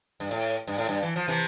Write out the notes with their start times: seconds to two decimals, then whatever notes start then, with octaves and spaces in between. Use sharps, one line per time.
0.20 G2
0.31 A2
0.67 G2
0.78 A2
0.89 G2
1.02 E3
1.16 F3
1.28 C3 E3